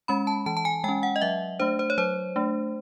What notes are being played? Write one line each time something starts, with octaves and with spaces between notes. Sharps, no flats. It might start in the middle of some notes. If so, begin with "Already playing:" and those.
G#3 C#4 B5
A5
E3 A5
A5
G#5
G#3 C#4 G5
F#5
D#5
F#3 E5
A3 D4 C5
C5
C#5
F#3 C5
A3 D4